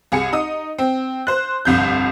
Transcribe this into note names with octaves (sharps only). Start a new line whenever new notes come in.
C2 G#4 C#7
D#4 D#6
C4
C5 F#6
G1 C2 F2 G6